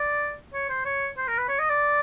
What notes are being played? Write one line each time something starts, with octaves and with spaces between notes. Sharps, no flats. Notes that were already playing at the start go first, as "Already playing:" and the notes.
Already playing: D5
C#5
C5
C#5
C5
A#4
B4
C#5
D#5
D5